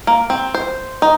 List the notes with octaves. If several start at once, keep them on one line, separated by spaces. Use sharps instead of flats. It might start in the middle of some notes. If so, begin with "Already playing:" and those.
A#3
C4
C5
D#4